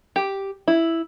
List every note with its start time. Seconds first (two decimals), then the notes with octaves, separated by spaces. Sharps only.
0.16 G4
0.68 E4